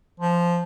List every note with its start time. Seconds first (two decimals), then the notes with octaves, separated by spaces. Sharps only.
0.20 F3